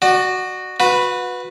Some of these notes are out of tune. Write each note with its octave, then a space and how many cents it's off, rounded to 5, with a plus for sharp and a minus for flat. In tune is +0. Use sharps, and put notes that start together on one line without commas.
F#4 +0 D5 +40
F#4 -30 B4 +0